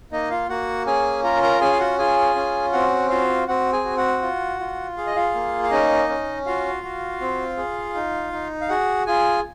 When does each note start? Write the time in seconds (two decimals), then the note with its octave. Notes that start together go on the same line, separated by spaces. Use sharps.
0.12 A#3 D#4 D#5
0.30 F4 F5
0.49 A#3 F#4 F#5
0.86 C#4 G#4 G#5
1.23 F4 A#4 A#5
1.43 A#4 A#5
1.61 C#4 G#4 G#5
1.73 F5
1.79 F#4 F#5
1.98 F4 G#4 G#5
2.36 C#4
2.73 C4 F#4 F#5
3.10 F4 F#4 F5
3.48 C4 F#4 F#5
3.72 G#4 G#5
3.85 F#4
3.97 F#4 F#5
4.21 F4
4.59 F4
4.97 G#4 F5
5.06 D#5
5.16 F4 F5
5.34 A#3
5.63 F5
5.71 C#4 D#4 D#5
6.09 C#4
6.46 F4 F#4 F5
6.83 F#4
7.21 C4
7.57 G#4
7.95 D#4
8.33 D#4
8.61 F5
8.69 F#4 G#4 F#5
9.06 F4 G#4 G#5